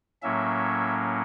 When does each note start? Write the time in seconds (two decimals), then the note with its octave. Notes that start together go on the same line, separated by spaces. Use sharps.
0.22 A2 F#3 A#3 C#4 E5